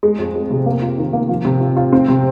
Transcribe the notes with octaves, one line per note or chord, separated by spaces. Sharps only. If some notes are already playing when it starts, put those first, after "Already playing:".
G#3
F2
G#3
C3
A#3
F4
D#3
A#3
F3
C3
F4
F4
C4
C3